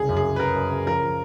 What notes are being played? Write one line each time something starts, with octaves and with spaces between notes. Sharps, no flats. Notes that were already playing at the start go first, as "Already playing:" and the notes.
Already playing: C2 C#3 G#4
F#2
G#4
C#3
B4
F#2 A#4
F#2
C#3
F3 A#4
F3